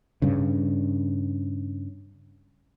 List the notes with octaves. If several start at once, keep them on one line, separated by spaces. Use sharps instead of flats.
G2 C#3